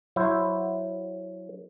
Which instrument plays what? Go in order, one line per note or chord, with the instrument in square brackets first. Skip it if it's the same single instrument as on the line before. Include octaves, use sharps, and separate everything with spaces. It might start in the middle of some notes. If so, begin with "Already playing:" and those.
[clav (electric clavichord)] F#3 E4 F#4 C5